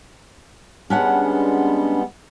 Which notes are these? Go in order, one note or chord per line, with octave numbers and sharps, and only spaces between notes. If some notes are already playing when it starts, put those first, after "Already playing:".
G3 G#3 B3 C#4 D4 F#5